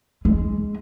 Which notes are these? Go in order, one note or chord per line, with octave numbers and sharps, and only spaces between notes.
G#3